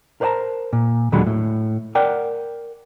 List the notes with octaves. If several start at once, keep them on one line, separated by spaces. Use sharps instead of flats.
A#4 C5 D5 F#5 A5 A#5
A#2
D#2 A#2 D3 F#3 G#3 B5
A2
A#4 D5 F#5 G5